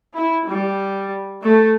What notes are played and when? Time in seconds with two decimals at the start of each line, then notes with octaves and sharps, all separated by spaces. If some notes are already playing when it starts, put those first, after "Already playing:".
0.14 E4
0.47 G3
1.44 A3